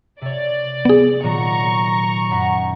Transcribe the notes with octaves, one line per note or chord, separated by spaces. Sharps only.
C3 C#5 D5
B3 G#4
A#2 D#3 F#3 A#5 C#6
F#2 F#5 B5